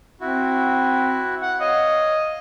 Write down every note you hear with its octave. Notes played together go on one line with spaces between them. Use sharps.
C4 E4 F#4
F#5
C#5 D#5 F5